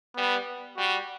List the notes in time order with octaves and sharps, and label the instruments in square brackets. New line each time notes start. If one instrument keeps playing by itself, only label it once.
[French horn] G3 [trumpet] B3
[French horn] G3 [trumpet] F#4